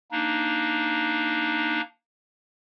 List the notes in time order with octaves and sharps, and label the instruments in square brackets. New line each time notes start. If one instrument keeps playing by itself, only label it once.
[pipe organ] A#3 D4 D#4